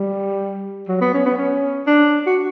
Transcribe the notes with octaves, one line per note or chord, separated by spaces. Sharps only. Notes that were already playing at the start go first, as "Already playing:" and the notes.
Already playing: G3
F#3
B3
C#4
B3
C#4
D4
F#4